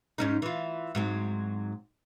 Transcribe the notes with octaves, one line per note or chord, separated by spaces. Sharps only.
G#2 C#4 D#4
E3 F4
G#2 F#3 C4